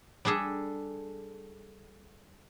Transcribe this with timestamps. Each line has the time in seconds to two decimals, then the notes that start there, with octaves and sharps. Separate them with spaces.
0.25 G3 D4 G#4 A4